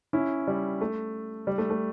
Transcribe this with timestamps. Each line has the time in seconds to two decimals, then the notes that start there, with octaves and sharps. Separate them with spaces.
0.13 C#4 E4
0.47 G3
0.81 A3
1.47 G3
1.58 A3
1.70 A3